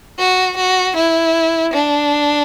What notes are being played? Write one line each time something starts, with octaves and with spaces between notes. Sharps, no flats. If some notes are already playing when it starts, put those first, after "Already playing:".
F#4
F#4
E4
D4